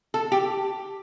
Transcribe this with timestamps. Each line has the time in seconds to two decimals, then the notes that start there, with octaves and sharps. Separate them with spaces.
0.14 A4
0.32 G4